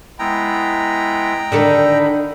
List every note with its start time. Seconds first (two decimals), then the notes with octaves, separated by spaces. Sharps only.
0.19 G#3 B3 E4 G5 A#5
1.52 D3 D#3 D#4 A4 B5